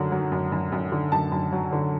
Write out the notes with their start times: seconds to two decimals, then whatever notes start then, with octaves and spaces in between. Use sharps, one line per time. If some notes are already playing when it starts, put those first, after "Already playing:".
Already playing: F#2 D3 F#3
0.12 F#3
0.32 F#2
0.52 F#2
0.72 F#2
0.92 D3
1.12 F#2 A5
1.32 F#2
1.53 F#3
1.73 D3